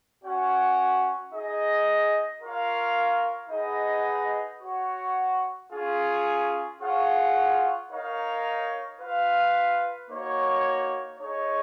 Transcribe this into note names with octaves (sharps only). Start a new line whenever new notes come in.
C#4 F#4 C#5 F#5
D#4 G#4 D#5
F4 A#4 C#5 F5
D#4 G#4 B4 D#5 F#5
F#4 C#5 F#5
C#4 F4 G#4
F4 G#4 C#5 F#5
D#4 A#4 C#5 F5
F4 B4 F5
A#3 D#4 F#4 C#5
D#4 G#4 C#5